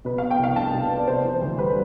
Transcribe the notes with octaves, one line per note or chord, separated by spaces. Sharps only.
B2 B4
F5
B3
G5
C2 F5
D4 A5
B2
B3
D5
C3 C5
E3
D2
G3 B4